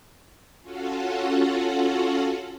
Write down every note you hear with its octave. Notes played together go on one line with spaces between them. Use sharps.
C#4 F4 F#4 A4 F#5